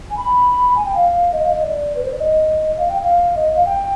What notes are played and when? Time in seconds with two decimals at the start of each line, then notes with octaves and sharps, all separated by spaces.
0.10 G#5
0.17 B5
0.75 G#5
0.84 G5
0.94 F5
1.32 D#5
1.42 F5
1.52 D#5
1.62 D5
1.95 B4
2.03 C5
2.11 D5
2.19 D#5
2.77 F5
2.88 G5
3.01 F5
3.35 D#5
3.54 F5
3.65 G5